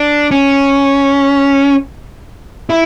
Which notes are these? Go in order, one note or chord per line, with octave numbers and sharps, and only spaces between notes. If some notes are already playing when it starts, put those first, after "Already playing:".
Already playing: D4
C#4
E4